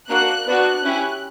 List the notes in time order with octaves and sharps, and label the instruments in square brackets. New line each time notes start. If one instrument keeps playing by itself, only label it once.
[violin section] A#3 D4 F#4 F#6
B3 D4 F#4 F#6
C#4 E4 G4